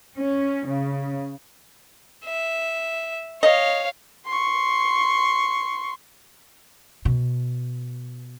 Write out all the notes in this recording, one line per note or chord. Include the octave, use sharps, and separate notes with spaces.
C#4
C#3
E5
C#5 D#5 F5
C6 C#6
B2